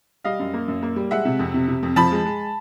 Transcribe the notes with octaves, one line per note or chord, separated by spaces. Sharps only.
G3 D#5 F5
F#2
A#3
F#2
A#3
G3
G#3 E5 F#5
C3
F2
C3
C3
F2
F3 A5 B5
G#3
G#3